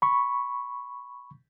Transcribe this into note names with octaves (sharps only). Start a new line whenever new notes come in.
B5 C#6